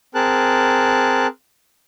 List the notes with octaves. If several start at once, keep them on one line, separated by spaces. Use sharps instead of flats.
C4 G#4 A#4 A5 F#6